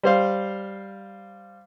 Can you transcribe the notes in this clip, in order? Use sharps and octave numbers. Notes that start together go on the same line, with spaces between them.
G3 C5 F5